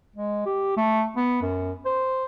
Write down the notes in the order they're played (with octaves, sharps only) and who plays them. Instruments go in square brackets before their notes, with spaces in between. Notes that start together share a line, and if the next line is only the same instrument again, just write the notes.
[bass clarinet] G#3
G4
A3
B3
F#2
C5